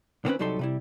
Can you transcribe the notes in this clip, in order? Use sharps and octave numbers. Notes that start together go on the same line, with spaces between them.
D3 D#3 A#3 C4 C#4 B4
C2 F#3 G3 D#4 A4 C6
C3 G3 E4